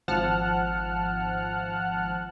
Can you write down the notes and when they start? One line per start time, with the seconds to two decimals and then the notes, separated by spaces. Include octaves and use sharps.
0.08 G#1 F3 F#5 A5 F6 F#6